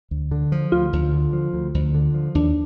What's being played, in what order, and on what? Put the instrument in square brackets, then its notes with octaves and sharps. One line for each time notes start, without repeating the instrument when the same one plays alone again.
[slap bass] D2
D3
F3
[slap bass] D2 [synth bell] F4
[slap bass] D2
D3
F3
D2
D2
D3
F3
[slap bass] D#2 [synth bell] D4